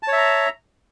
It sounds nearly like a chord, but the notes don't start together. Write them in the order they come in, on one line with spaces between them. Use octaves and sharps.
A5 C#5 E5 A#5